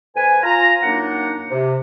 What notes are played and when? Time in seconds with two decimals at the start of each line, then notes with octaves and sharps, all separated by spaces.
0.16 F2 B4 G#5
0.43 F4 A#5
0.83 F#2 A#3 D4 D#4 F#5
1.50 C3